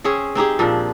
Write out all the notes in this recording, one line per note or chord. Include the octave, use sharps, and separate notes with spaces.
C4 C#4 G#4
C4 D#4 G4 G#4
A#2 F3 D4